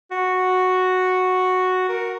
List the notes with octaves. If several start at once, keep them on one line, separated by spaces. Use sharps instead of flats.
F#4
A#4